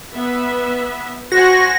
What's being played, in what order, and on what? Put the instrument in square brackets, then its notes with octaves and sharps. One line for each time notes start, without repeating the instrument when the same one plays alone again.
[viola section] B3 B4 E5
[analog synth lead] F#4 [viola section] C5 F#5 G#5 [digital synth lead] A#6